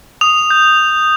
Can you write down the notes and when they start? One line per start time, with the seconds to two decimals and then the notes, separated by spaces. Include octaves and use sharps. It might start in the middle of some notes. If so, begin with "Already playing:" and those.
0.21 D#6 F7
0.51 G6